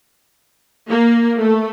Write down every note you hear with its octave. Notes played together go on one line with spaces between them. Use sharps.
A#3
A3